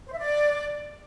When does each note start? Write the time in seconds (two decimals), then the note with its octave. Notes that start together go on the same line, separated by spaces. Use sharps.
0.06 C5
0.12 E5
0.18 D5